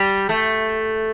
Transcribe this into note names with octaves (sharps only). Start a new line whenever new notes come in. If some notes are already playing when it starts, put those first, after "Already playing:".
Already playing: G3
A3